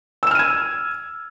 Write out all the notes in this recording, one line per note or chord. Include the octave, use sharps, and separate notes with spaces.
E6 F6 G#6 D#7 E7